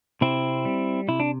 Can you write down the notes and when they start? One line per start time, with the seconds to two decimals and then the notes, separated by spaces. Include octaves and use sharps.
0.21 C3 C4 E4
0.65 G3
1.08 C3 E4
1.20 D4